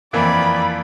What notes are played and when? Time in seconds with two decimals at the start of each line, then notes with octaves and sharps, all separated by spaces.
0.13 F2 E3 A#3 D5 B5